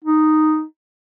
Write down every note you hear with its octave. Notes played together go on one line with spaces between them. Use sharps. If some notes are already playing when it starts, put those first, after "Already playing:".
D#4